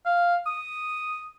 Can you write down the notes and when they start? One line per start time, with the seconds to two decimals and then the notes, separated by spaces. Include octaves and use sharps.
0.06 F5
0.47 D#6